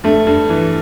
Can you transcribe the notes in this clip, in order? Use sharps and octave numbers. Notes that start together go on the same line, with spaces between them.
G2 A3
G2
E3